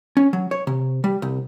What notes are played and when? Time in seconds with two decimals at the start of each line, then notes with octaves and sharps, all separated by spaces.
0.17 C#4
0.33 F#3
0.51 C#5
0.67 C3
1.04 G3
1.22 C2